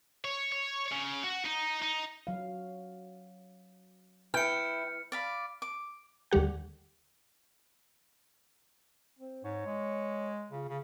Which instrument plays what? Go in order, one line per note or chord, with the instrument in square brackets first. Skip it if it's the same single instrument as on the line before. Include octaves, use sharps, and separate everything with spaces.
[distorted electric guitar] C#5
C#5
C#3
F#4
D#4
D#4
[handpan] F#3 F5
[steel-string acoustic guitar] E4 [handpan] B4 [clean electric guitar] G5 [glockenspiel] F6 C#7
[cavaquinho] D5 F5 B5
D6
[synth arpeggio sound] D#2 D3 G3 G4 F#5
[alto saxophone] C4
[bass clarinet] G#2 [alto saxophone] C#5
[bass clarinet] G#3
[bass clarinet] C#3 [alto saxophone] F4
[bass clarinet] C#3